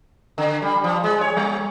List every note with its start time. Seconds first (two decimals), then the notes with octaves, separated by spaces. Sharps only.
0.38 D3
0.62 G3
0.84 F3
1.04 G#3
1.21 C#5
1.37 G3